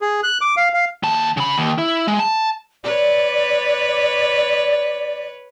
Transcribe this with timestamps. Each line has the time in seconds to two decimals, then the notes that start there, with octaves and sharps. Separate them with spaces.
0.02 G#4
0.23 F#6
0.41 D6
0.57 F5
0.74 F5
1.03 D#2 A5
1.37 C#3 B5
1.58 D#2
1.78 E4
2.07 G#3
2.19 A5
2.84 B4 C#5 D5